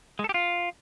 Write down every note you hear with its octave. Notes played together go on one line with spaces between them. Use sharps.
G#3
A4
G4
F4